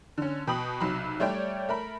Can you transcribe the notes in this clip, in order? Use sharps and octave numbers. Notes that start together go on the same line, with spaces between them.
D3 C#4
B2 G5 B5 D#6 F#7
B1 C3 F#3 B5
G3 A3 C#5 D5 G5
A3 A#4 B5